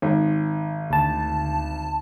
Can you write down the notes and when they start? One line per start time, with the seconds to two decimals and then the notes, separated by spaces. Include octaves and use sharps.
0.02 G#1
0.91 D2 A5